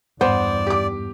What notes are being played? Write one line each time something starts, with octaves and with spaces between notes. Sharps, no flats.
E2 G2 B3 C5 D5
G4 D6